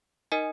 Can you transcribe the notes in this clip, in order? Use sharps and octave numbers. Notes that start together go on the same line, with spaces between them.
D#4 A#4 D#5 G#5